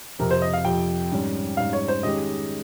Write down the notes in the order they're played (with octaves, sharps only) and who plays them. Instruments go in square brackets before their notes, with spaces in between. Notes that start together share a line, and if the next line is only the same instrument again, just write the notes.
[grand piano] F2 C3 F3 C4 G4 [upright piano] A#4
[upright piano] C5
D#5
F5
[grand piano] F2 C3 F3 C4 G4 [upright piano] G5
[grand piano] G#2 G3 C#4
[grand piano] G#2 G3 C#4 [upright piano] F5
[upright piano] C#5
C5
[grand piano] D#3 G#3 C#4 G4 [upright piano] D#5